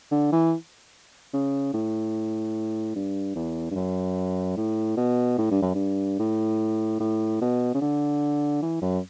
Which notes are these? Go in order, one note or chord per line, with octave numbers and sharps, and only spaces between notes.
D3
E3
C#3
A2
G2
E2
G2
F#2
A2
B2
A2
G2
F#2
G2
A2
A2
B2
C#3
D3
E3
F#2